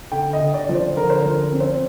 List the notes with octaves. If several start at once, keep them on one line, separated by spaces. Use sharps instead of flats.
D3 G5
D#5
D3
D5
F3
C5
D3 A#4
C5
A#4
F3
C4
C5